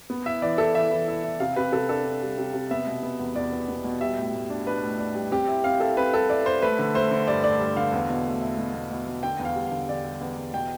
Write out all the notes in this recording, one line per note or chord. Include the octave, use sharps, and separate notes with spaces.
B3
E4 E5
E3 D5
E4 A4
E3 E5
E3
E4
E4
C3 F5
C3 B4
C3 A4
D4 A4
D4
G3
C3
C3
B3 E5
B2
B3
E2
E2 D5
B3
B3
B2
G3 E5
A2
A2
D4
D4 B4
A2
D4
G3
C4 G4
E4
C4 F5
E4 A4
C4 B4
G3 A4
E4 D5
E4 C5
A3 B4
D3
A3 C5
D3
G2 D5
A3 D5
G2
D3 F5
E2
B2
A3
E4
B2
B2
B2
B2
D3 G5
E2
F5
G3
D3 F5
D3 D5
G3
E2
E2
B2 G5